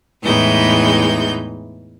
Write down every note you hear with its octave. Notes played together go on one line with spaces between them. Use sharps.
E2 A2 E3 G#3 D#4 G6